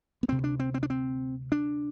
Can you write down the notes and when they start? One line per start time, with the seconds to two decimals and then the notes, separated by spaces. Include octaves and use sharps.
0.23 B3
0.28 D2 C3 C4
0.44 D4
0.60 C4
0.74 C4
0.83 D4
0.90 C4
1.52 D4